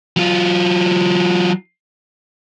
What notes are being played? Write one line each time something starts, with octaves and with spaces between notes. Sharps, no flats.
F#3 F4